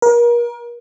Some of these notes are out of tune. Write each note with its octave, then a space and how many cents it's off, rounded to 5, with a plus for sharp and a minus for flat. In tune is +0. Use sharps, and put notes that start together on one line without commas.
A#4 +35